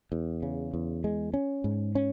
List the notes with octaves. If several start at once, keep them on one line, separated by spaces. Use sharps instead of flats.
E2
C#3
E2
G#3
C#4
G#2
C#4